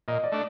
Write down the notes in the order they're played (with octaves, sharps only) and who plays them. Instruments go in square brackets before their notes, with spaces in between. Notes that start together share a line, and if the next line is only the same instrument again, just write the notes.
[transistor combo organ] A#2 [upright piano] D#5
[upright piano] D5
[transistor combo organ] A3 D4